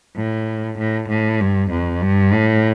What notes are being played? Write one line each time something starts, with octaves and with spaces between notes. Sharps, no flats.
A2
A2
A2
G2
F2
G2
A2